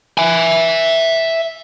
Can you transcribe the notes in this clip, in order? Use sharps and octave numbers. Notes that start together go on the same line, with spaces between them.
E5 G#5